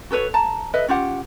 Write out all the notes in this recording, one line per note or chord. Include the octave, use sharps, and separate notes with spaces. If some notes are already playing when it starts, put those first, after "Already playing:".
F#4 A4 B4 C#5
A5 A#5
A4 B4 D#5 E5
C#4 F4 G4 F#5